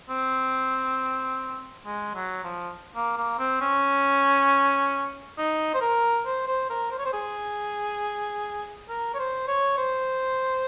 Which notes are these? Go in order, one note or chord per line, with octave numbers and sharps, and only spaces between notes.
C4
G#3
F#3
F3
A#3
A#3
C4
C#4
D#4
C5
A#4
C5
C5
A#4
C5
C#5
C5
G#4
A#4
C#5
C5
C#5
C5